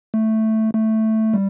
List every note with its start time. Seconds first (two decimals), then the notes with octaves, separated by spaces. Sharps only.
0.14 A3
0.74 A3
1.34 G3